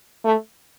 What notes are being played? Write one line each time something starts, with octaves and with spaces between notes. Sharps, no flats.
A3